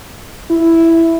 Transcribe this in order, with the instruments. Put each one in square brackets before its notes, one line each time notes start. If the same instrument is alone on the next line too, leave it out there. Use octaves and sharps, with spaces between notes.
[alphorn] E4